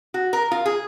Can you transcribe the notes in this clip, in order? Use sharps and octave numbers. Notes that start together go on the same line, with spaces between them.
F#4
A#4
F4
G#4